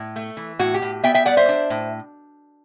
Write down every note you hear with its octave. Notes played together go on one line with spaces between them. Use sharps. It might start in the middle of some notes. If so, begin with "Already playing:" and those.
Already playing: A2
A3
E3
A2 F#4
G4
A2
B3 E5 G5
E5 G5
G3 D5 F#5
C5 E5
D4
A2